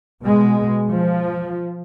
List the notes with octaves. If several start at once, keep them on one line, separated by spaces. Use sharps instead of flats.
B2 G#3
F3